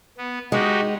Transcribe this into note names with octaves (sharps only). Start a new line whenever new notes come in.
B3
G#3 D#4 F#4 G4